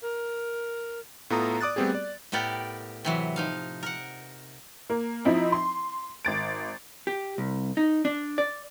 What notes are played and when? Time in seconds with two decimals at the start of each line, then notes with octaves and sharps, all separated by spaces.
0.02 A#4
1.30 A2 B3 F4 A4 A#5 D#6
1.61 D5 D6 D#6 F#6 A6
1.76 G3 A3 B3 C4 G4 G#4
1.95 D5
2.32 A2 B3 G4 A#4 D5 F#5
3.05 C3 E3 F#3
3.36 F3 D#4 F5
3.83 A#4 F#5
4.90 A#3
5.25 F3 C4 D#4 E4
5.52 C6
6.25 G#1 A6 D7
7.07 G4
7.38 C2
7.77 D#4
8.05 D4
8.38 D5